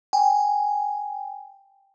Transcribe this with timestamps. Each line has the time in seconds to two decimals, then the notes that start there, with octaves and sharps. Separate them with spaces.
0.13 G5 G#5